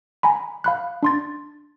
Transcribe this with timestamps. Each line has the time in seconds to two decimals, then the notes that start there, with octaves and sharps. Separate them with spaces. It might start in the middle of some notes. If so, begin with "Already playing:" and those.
0.23 G#5 A#5 B5
0.64 F5 B5 F#6
1.03 D4 C6 A6